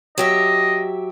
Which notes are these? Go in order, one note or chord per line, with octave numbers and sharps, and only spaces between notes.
F#3 G4 D#5 E5